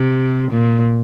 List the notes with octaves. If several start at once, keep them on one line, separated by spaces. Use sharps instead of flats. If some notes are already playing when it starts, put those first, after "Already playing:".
Already playing: C3
A#2